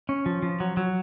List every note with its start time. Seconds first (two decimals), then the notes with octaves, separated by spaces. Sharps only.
0.09 C#4
0.26 F3
0.42 F3
0.60 F#3
0.77 F#3